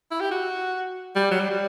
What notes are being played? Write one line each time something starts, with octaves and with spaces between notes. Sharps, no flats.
E4
G4
F#4
G3
F#3
G3
G3